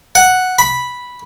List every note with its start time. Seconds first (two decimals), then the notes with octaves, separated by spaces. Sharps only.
0.15 F#5
0.59 B5